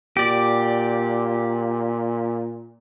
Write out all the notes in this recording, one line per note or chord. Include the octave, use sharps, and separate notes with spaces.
A#2 G4 D5